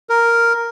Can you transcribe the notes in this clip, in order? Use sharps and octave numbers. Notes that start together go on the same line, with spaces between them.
A#4